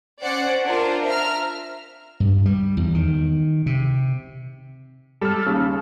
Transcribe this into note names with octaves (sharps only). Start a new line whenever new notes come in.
C#4 C5 D5 F#5
D4 F4 A#4 C5
E5 A#5 F6
G2
G3
E2
D#3
C3
G3 A4 F6
D#2 C#3